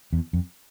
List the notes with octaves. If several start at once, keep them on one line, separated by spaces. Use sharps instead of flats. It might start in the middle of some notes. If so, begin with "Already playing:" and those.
E2
F2